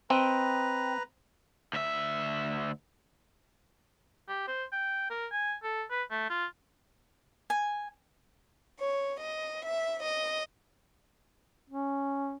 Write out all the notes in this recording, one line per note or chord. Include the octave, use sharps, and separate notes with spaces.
C4 B4 D#5 G5 A#5
D2 E5
G4
C5
G5
A#4
G#5
A4
B4
A3
F4
G#5
C#5
D#5
E5
D#5
C#4